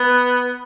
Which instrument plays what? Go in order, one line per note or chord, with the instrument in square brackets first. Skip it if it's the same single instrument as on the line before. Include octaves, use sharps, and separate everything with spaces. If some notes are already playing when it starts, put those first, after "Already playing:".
Already playing: [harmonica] B3